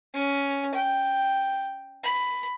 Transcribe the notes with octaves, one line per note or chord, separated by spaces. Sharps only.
C#4
G5
B5